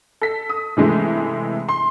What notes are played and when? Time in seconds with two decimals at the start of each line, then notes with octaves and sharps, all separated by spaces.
0.21 A4 B6
0.49 D#6
0.77 C3 E3 G#3 A3
1.69 C6